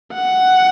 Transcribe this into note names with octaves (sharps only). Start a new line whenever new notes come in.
F#5